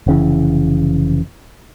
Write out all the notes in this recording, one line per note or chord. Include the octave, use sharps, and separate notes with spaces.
F1 C#3 E3